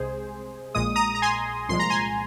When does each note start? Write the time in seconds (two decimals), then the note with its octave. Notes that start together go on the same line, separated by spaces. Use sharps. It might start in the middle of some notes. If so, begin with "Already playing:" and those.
Already playing: C2 C3 G#3 G#4 C5
0.75 A#1 A#2 G#3 D#6
0.96 A#5 D#6
1.15 A#5
1.22 G#5 C6
1.69 C2 A#2 F3 G#3 C6
1.79 A#5
1.90 G#5 C6